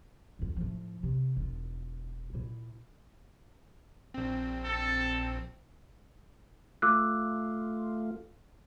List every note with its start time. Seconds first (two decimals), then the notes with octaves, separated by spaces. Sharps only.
0.39 F2 G#2
0.56 A2 F3
1.03 C3
1.36 E1 F4
2.33 A#2 E4
4.14 A#1 C4
4.65 A4
6.82 A3 F4 D6 E6 F#6